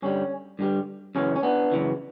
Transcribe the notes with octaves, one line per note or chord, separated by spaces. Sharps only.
G2 D3 G3 C#4
G2 D3 G3
F#2 C#3 E3 C#4
C#4
B3 D4
F#2 C#3 E3